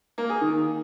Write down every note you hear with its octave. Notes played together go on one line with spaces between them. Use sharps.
A#3
G#4
D#3